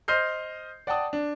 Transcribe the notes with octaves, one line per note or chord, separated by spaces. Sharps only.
C5 D#5 C6 F6 G6 C7
D5 F#5 G5 A5 D#6
D4